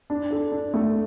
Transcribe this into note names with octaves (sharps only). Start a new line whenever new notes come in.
D4
A4
D4
A3